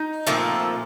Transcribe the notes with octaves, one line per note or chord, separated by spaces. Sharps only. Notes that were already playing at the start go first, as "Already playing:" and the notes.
Already playing: D#4
A#2 F3 A3 C4